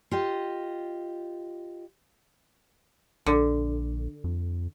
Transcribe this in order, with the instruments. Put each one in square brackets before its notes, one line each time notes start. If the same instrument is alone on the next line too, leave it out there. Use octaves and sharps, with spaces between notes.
[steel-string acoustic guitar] F4 G4 D#5
[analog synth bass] A#1 [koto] D3
[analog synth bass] F2